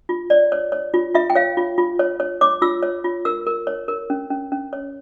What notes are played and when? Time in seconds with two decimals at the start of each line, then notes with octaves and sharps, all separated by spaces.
0.09 F4
0.30 C#5 D5
0.52 C#5
0.72 C#5
0.94 F4
1.15 F4 E5
1.30 G5
1.35 C#5 F5
1.57 F4
1.78 F4
1.99 C#5
2.20 C#5
2.41 C#5 D6
2.62 F4 E6
2.83 C#5
3.04 F4
3.25 A#4 E6
3.46 A#4
3.67 C#5
3.88 A#4
4.10 C#4
4.30 C#4
4.52 C#4
4.73 C#5